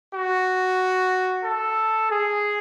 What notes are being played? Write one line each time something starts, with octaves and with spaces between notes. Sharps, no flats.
F#4
A4
G#4